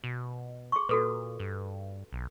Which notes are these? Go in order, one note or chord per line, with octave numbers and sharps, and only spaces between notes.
B2
G#4 C6 C#6
A#2 F#4 A4 B4
G2
B1